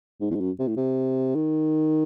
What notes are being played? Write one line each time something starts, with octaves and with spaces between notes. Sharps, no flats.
G#2
E2
G#2
F#2
C3
A2
C3
D#3